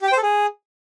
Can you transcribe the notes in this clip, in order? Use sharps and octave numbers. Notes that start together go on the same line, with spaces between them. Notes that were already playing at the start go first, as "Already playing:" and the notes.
G4
G5
C5
A4
G#4